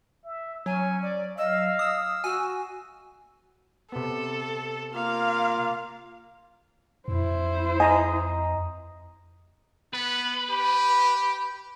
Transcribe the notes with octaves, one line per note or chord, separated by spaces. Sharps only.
E5
F#3 C#4 G#5
D5
D#5 F5 E6
D#6 E6
F#4 G#5
C3 B3 A4
A#3 F4 F5
F2 E4 C5
D#5 G#5 A#5 D#6
B3 B4
G4 B5